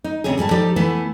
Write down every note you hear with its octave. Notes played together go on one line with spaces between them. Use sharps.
D#4
D2 C3 C#4 G#4
G#2 G3 G#4 A5
F3 D#4 G4 A4 D5
E3 A3 B3 E4 B4